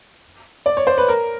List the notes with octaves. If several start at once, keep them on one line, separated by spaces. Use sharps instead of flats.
D5
C#5
C5
B4
A#4